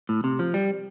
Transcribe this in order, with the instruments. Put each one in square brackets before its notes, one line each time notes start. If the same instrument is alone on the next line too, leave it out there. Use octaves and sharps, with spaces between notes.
[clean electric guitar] A2
C3
F3
G3